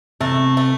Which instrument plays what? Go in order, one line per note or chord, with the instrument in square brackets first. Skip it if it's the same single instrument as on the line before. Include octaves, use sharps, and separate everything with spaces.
[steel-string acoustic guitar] C3 [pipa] A3
[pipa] A3